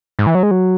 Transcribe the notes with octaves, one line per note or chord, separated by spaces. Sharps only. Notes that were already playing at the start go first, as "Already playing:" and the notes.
G#2
E3
F#3
G#3
F#3